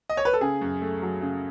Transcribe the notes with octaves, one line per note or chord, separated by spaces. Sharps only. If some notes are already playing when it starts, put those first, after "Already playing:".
D#5
C#5
B4
A4
C#3 G#4
F#2
A3
F#3
C#3